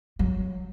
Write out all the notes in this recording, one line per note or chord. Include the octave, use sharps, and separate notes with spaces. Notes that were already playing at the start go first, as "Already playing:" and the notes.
F#3